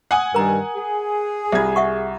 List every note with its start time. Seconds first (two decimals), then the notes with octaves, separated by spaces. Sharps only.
0.11 F#5 G#5 D#6
0.34 G2 D#3 G3 A#4 A#5
0.75 G#4
1.52 C2 F4 E5 G#6
1.76 E5 F#5 C#6